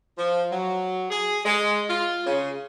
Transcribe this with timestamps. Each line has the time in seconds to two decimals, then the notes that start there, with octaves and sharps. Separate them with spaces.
0.18 F3
0.51 F#3
1.10 G#4
1.46 G#3
1.89 F4
2.26 C#3